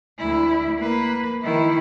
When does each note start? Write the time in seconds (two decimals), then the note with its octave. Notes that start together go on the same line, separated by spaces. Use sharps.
0.18 D2 E4
0.78 A#3 B4
1.43 D#3 E4